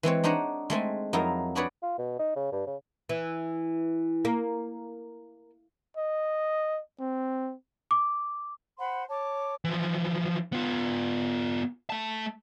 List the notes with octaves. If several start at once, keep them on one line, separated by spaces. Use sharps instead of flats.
E3 G#3 C4 C#5
D4 D#4 C5 C#5 D#5 F#5
G#3 A3 C4 G#5
F2 F#3 D#4 E4 A#4 F5
D4 F#4 G#4 B4 C#5 D5
F4
B2
D#4
C#3
G2
C#3
E3
A#3
D#5
C4
D6
C5 F#5 B5 C6
C#5 A5 D6
E3 F3
B3 F4
A3 A5